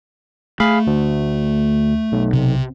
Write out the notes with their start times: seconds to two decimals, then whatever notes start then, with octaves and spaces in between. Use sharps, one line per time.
0.60 A3 G#4 F5 B5
0.87 D2
2.12 B1
2.33 C3